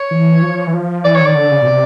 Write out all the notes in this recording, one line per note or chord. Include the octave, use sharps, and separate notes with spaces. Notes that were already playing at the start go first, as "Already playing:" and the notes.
Already playing: C#5
E3
F3
E3
F3
E3 D5
D#3 C#5
D5
D3
C#3
B2
C3